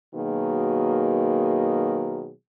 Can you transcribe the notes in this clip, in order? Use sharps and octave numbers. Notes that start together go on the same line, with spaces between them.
B2 D#3 F#3 A#3 G#4